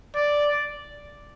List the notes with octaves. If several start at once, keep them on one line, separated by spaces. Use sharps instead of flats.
D5